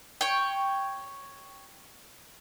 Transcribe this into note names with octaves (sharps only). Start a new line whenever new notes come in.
C#5 G5